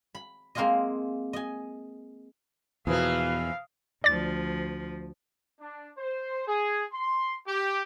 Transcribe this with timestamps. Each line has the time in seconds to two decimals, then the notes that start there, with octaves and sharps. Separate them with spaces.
0.15 B5
0.55 G#3 A#3 C4 F4 G#4 D#5
1.33 D#5 G#5
2.87 E2 B2 E3 F3 A#3 B4 F5 D#6
4.04 D2 F3 D5 A6
5.60 D4
5.97 C5
6.47 G#4
6.92 C6
7.47 G4